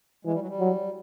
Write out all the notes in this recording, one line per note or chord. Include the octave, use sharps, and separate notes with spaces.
E3 G#3
G3
F#3
G3
F#3